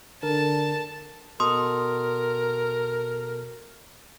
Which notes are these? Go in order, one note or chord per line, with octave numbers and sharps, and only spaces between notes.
D3 A#4 A5
B2 A4 A#4 C6 D#6